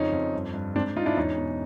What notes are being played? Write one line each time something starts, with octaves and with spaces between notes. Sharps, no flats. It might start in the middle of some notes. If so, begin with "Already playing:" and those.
Already playing: F2 C#3 C#4 D#4
F2
G2
G2
G#2 C4 D4
G#2 D#4 F4
D4 E4
E2 C#4 D#4
B2